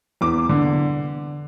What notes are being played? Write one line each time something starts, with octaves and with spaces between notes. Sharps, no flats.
E2 D6
D3